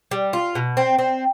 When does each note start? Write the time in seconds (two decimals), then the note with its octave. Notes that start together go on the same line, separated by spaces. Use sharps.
0.11 G3
0.33 F4
0.55 B2
0.77 C4
0.99 C4